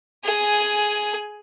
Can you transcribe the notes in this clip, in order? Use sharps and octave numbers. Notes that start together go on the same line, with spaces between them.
G#4 G#5